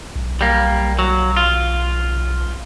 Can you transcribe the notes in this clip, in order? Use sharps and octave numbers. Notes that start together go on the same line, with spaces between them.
B1
G3 A#3
F#3
F4